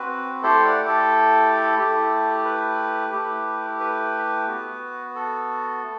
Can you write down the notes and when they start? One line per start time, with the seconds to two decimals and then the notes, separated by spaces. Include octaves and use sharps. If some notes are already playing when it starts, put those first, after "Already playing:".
Already playing: C4 F#4 B4
0.43 A3 E4 G4 A4 C5
0.65 D5 F#5
0.88 A4
1.78 A3 E4 G4
2.45 B4
3.13 A3 E4 G4
3.80 B4
4.48 B3 F#4
5.15 A4
5.83 A3